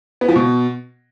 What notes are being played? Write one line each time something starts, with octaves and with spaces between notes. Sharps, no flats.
B3
F3
B2